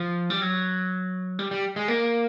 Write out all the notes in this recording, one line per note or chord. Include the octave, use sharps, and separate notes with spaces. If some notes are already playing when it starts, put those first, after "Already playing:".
Already playing: F3
G3
F#3
G3
G3
G#3
A#3